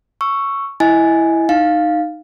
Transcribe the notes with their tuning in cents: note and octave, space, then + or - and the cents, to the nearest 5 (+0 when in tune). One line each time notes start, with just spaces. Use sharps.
C#6 +0 E6 +10
E4 +0 D#5 +25 G#5 +0
D#4 -10 F5 +0